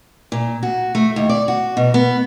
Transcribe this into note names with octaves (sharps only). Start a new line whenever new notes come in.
A#2
F#4
A3
D#2
D5
F#4
B2
B3